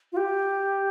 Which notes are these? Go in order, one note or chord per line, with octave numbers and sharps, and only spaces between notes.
F4
G4